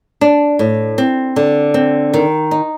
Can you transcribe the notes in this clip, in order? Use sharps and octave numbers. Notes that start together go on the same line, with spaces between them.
D4
A2
C4
D3
C4
D#3
D#4